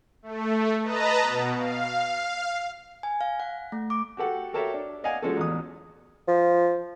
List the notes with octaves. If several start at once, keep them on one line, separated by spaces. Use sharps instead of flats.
A3
B4 D#5 A5 A#5
B2
F5
G#5
F5
F#5
A3
D6
F#4 G4 A4 F#5
F#4 G4 A4 A#4 C#5 E5
D4
D5 D#5 F5 F#5 G#5
F3 G#3 C#4 F#4 A4
A1 E2 D#6
F3